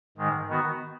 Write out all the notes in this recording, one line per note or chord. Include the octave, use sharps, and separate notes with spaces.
G#2 D#3 G#3
D#3 B3 F#4